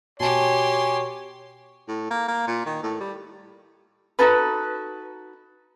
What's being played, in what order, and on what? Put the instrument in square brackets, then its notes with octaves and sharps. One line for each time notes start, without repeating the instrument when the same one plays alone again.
[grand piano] B2 A5 [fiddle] G4 C6 [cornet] C#5 [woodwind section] G#5
[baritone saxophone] A2
A#3
A#3
A#2
D#3
A2
G3
[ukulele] D#4 F#4 A4 B4